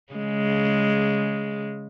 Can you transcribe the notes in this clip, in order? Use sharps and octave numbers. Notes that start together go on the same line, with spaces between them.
C#3 G#3